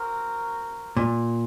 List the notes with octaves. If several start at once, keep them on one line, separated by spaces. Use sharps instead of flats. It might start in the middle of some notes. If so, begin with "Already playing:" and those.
Already playing: C4 F#4 A#4
A#2